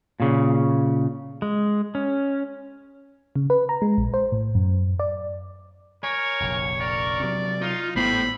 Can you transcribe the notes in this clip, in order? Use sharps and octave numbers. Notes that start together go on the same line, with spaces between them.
A#2 C#3
G#3
C#4
C#3
B4
A#5
G#3
A#1
C5
A2
F#2
D5
A#4 C#5 G#5
F1 A#1
A#4 D5
C3 F#3
D#4 F4
G#1 A2 B3 C5 B5